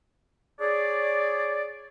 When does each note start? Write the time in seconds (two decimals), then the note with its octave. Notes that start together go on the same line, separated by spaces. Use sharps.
0.60 G#4 C#5 D5